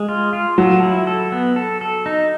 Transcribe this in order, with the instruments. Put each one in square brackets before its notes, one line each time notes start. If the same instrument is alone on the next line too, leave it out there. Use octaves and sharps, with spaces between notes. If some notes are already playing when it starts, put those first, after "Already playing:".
Already playing: [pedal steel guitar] G#3
F4
F4
[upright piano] F#3 [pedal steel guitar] A4
[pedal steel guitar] E4
A4
B3
A4
A4
D#4